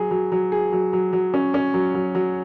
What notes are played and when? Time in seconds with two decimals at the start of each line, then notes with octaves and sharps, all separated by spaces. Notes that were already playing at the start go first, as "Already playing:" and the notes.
Already playing: F#3 G#4
0.11 F#3
0.32 F#3
0.52 G#4
0.72 F#3
0.93 F#3
1.13 F#3
1.34 C#4
1.54 C#4
1.74 F#3
1.94 F#3
2.15 F#3